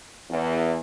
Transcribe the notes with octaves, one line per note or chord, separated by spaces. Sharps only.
E2